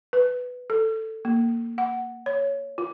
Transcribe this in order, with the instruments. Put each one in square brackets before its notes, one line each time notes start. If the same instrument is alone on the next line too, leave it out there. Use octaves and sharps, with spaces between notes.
[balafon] B4
A4
A#3
F#5
C#5
F4